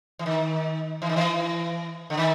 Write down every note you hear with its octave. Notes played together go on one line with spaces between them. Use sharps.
E3
D#3
E3
D#3
E3
D3
D#3